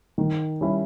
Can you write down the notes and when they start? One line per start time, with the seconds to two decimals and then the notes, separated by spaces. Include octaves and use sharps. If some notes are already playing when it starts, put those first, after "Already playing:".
0.18 D#3
0.61 G3 C#4 E4